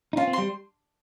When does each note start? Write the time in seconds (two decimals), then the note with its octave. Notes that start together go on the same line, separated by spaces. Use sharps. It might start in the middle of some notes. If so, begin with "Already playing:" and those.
0.13 D#4
0.17 C#4 F4
0.27 C4
0.33 C6
0.38 G3